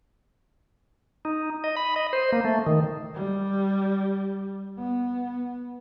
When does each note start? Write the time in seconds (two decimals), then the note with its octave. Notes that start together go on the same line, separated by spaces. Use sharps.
1.25 D#4
1.64 D#5
1.76 B5
1.96 D#5
2.13 C5
2.32 A#3
2.45 A3
2.66 D#3
3.14 G3
4.79 B3